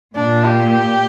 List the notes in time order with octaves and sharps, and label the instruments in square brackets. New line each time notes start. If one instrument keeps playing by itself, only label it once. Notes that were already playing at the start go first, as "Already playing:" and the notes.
[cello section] A#2 [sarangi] D4
[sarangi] G4